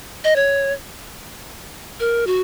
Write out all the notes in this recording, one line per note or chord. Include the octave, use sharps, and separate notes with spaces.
D#5
C#5
A#4
F#4